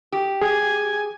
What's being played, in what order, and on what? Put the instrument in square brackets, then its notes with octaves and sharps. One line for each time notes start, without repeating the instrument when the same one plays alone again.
[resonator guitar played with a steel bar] G4
[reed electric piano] G#4 [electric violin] G#5